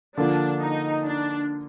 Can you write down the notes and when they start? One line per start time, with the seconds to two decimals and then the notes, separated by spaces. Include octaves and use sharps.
0.18 D3 F3 A#3 D4 F4
0.61 D#4
1.05 D4